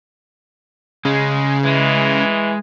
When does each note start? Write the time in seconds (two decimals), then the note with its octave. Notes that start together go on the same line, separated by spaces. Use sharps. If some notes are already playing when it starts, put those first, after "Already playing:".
1.05 C#3 G#3
1.65 E3 G#3